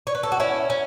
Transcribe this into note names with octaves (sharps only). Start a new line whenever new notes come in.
C#5
B4
A4
F#4
C#4 E4
C#4